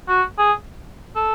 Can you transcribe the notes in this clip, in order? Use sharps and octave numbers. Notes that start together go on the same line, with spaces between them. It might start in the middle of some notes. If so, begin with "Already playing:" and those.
F#4
G#4
A4